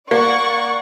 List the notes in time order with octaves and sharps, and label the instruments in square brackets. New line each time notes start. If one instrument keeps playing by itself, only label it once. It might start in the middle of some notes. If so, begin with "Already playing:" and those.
[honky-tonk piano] A#3 [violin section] D5 F#5 C#6